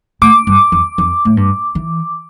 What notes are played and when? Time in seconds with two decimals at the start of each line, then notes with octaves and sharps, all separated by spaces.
0.22 A2 D6
0.47 G2
0.72 F2
0.98 F2
1.25 A2
1.37 G2
1.75 E3